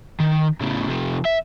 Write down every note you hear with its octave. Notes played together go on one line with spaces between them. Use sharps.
D#3
A2 C#3
C3 F3
E5